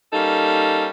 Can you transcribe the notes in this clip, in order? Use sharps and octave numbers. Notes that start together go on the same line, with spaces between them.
G3 A#3 C#4 D#4 A4